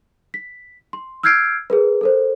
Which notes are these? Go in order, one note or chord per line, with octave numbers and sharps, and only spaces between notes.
B6
C6
E6 F6 G6 G#6 C7 D7
G#4 A#4 B4
A4 A#4 C5